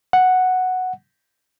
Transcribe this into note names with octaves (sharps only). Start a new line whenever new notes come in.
F#5